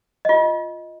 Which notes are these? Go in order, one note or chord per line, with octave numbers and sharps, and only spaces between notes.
F4 D#5